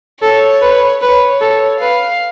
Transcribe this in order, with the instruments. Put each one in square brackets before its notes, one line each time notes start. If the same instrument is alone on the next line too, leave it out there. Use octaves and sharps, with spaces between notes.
[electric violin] A4 [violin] C#5
[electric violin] B4
[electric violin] B4 [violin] C#5
[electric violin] A4
[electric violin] B4 [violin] F5